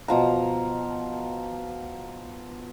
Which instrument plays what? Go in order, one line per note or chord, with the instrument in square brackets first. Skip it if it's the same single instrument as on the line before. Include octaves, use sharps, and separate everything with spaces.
[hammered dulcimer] B2 F3 A#5